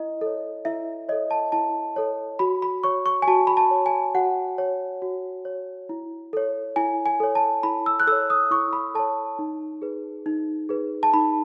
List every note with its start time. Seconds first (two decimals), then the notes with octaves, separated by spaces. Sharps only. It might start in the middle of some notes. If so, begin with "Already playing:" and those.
Already playing: E4 D#5
0.21 A4 C#5
0.65 E4 E5
1.09 A4 C#5 D#5
1.31 A5
1.52 E4 A5
1.96 A4 C#5
2.39 F#4 B5
2.62 B5
2.84 C#5 C#6
3.06 C#6
3.22 G#5
3.27 F#4 A5
3.47 B5
3.57 A5
3.71 C#5
3.86 G#5
4.15 F#4 F#5
4.58 C#5
5.02 F#4
5.45 C#5
5.89 E4
6.33 A4 C#5
6.76 E4 G#5
7.06 G#5
7.20 A4 C#5
7.35 A5
7.63 E4 B5
7.86 E6
8.00 F#6
8.07 A4 C#5 E6
8.30 D#6
8.51 E4 C#6
8.73 B5
8.95 A4 C#5 A5
9.39 D#4
9.82 G#4 B4
10.26 D#4
10.69 G#4 B4
11.03 A5
11.13 D#4 B5